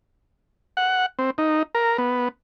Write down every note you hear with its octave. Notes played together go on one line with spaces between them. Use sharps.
F#5
C4
D#4
A#4
B3